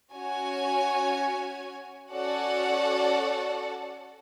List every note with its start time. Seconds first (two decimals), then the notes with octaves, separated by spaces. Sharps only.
0.13 C#4 F#4 C#5 G#5
2.12 C#4 F#4 A4 D5 F#5